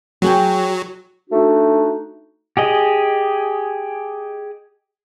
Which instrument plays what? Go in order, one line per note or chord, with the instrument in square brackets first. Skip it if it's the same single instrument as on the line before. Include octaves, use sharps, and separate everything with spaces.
[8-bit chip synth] F#3 [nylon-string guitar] F#4 G#4 G5
[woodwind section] A3 D4 D#4 F#4
[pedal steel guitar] G4 G#4 D#5